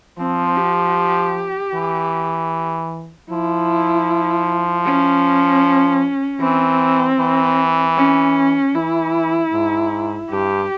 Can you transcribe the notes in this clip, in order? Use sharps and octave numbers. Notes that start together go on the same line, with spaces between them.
F3 C4
G4
E3
F3 E4
C#4
E3 C4
E3
C#4
E3 E4
G#2
G2 G4